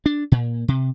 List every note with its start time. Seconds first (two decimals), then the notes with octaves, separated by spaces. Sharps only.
0.06 D4
0.32 A#2
0.68 C3